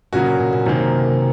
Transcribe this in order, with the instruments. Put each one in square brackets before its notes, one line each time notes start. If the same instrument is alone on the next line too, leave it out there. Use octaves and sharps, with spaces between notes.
[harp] A#2 [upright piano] C#3 F#3 A#3 C#4 F#4
[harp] A#2
A#2
A#2
[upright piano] F#2 D#3 A#3 [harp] C3